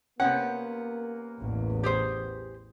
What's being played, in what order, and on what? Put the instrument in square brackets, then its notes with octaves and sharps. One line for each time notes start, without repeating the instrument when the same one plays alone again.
[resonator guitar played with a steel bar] C3 B3 C#4 [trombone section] A#3 [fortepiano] F#5
[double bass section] A1 E2
[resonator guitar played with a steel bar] G4 G#4 C5